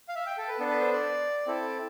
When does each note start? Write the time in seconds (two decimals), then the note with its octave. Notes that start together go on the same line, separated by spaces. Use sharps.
0.09 F5
0.15 E5
0.26 G5
0.37 A4
0.48 B4
0.59 B3 D4 A4
0.70 B4
0.81 C5
0.92 D5
1.46 C4 E4 A4